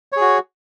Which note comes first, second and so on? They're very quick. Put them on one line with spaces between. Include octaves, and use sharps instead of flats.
C#5 G#4 F#4